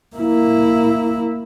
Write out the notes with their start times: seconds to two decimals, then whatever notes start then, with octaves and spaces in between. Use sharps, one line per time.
0.16 A#3 E4